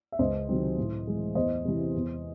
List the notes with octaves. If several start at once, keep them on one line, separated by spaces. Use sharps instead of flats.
E5
C#2 C5 D#5
C3 D#3 F#3 C4
A2
E3 G#3
E2 C5 D#5
C3 E3
E2